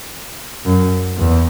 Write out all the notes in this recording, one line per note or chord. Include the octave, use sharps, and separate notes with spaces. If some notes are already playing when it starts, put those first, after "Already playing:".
F#2
E2